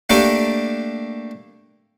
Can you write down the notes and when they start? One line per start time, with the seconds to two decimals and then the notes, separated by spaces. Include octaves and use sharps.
0.10 A3 A#3 D4 G4 A4 A#4